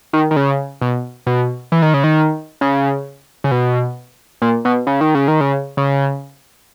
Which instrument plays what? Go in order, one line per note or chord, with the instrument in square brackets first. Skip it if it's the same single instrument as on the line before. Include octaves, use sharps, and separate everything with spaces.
[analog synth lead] D#3
D#3
C#3
B2
B2
E3
D#3
C#3
D#3
C#3
C#3
B2
A#2
B2
C#3
D#3
C#3
D#3
C#3
C#3